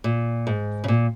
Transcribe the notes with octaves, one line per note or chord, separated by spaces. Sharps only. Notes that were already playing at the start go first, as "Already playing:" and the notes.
A#2
G#2
C#3
A#2